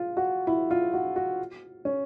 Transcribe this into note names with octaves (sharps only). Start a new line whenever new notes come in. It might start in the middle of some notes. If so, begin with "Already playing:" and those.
Already playing: F4
F#4
E4
F4
F#4
F#4
C#4